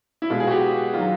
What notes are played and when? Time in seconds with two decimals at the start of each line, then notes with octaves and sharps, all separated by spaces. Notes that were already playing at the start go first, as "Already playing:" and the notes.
0.22 E4
0.30 B2 G#3 F4
0.40 G#4
0.47 F#4
0.51 G4
0.94 D#3 F#3 F4